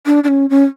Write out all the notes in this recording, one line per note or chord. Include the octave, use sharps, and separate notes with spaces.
D4
D4
C#4
C#4